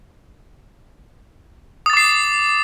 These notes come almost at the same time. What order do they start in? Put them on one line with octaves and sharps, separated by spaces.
D#6 A6 D6 C7